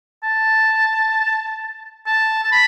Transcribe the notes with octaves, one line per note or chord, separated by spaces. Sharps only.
A5
A5
A5
B5